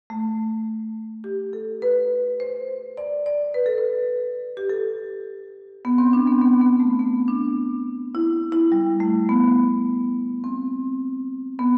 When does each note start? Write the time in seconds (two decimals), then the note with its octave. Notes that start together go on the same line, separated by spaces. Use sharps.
0.10 A3
1.24 G4
1.53 A4
1.82 B4
2.40 C5
2.97 D5
3.26 D5
3.54 B4
3.66 A4
3.78 B4
4.57 G4
4.69 A4
5.85 B3
5.98 C4
6.13 D4
6.27 B3
6.41 B3
6.61 B3
6.80 A3
6.99 B3
7.28 D4
8.15 E4
8.52 E4
8.72 G3
9.00 A3
9.29 B3
10.44 C4
11.59 B3